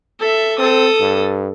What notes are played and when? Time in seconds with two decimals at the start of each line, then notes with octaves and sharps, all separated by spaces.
0.19 A4 E5
0.58 C4 A4 D#6
1.00 G2